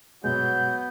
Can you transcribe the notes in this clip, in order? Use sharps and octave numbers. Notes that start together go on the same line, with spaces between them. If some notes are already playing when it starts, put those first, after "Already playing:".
G2 B2 F#3 G#3 B3 G6